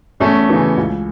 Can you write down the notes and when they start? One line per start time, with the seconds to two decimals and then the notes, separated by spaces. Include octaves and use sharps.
0.20 E2 A3 C#4
0.49 C#3 E3
0.77 C#2